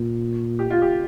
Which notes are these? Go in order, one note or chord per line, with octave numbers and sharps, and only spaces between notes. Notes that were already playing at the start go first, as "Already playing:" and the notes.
Already playing: A#2
G4
F4
G4